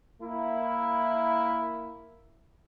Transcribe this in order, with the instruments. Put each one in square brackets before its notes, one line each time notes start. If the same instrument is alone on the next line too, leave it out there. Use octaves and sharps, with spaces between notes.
[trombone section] A#3 E4